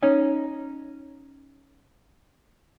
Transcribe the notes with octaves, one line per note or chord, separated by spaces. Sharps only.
C#4 D#4